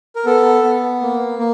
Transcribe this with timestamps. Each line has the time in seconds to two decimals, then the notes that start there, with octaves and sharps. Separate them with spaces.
0.16 A#4
0.25 B3 A4
0.64 B3
1.01 A#3
1.38 A#3